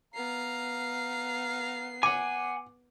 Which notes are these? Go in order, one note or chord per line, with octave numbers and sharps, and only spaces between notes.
B3 F5 A#5 C7
F#5 G#5 D6